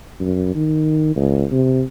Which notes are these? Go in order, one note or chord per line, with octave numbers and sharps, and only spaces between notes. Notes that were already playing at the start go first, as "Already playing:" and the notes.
F#2
D#3
C#2
C3